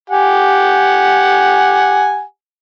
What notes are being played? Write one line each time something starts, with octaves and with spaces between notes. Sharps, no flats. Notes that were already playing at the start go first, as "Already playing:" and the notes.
G4 F#5 G#5